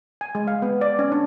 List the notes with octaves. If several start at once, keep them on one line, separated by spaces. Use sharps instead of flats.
G#5
G#3
F5
B3
D5
C#4
D4